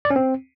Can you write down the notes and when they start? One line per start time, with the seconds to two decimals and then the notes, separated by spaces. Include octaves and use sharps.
0.05 D5
0.10 C#4
0.16 C4